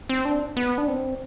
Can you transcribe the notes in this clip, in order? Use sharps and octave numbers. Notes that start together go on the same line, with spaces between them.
C4
D4
B3
D4
C4